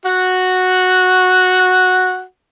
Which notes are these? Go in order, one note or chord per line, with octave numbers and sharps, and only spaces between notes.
F#4 F#5